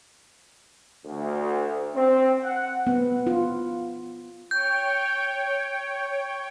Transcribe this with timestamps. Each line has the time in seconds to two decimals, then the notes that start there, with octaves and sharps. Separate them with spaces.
1.05 D2
1.94 C4
2.43 F#5
2.87 B3
3.27 F4
4.51 C#5 G5 G6